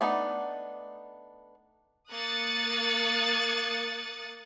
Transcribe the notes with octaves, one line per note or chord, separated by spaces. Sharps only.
A3 B3 D4 D#4
A#3 D#6 F#6 A6 C#7